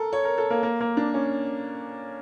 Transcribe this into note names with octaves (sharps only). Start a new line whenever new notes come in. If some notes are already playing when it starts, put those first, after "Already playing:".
Already playing: A4 A#4
C#5
A#4
A4
A#3
A#3
A#3
D4
C#4